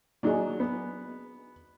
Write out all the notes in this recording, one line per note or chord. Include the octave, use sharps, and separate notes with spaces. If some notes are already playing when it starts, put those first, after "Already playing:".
F#3 A#3 D4 D#4 G#4
B3